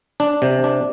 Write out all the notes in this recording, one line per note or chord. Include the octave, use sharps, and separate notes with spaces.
D4
C3
D4